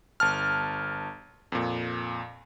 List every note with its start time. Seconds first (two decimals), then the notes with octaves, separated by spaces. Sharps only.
0.20 G1 A5 F6
1.52 F2 A#2